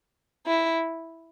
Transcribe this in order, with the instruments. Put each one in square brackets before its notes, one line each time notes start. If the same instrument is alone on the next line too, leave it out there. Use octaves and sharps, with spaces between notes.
[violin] E4